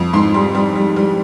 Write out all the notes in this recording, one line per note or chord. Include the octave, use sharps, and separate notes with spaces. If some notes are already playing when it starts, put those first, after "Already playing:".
Already playing: F2
G#2 C6
G3
G3
G3
G3